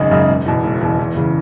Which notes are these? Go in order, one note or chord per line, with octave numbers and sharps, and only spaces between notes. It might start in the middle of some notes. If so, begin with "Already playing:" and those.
Already playing: G#1 F#2 C#3 G#3 D#4
F#2 C#3 G#3 D#4
E1
E2 B2
E1
E2 B2
E2
C#3 E3